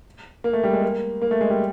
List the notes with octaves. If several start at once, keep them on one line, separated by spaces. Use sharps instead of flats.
A#3
A3
G3
G#3
A#3
A#3
A3
G#3
G3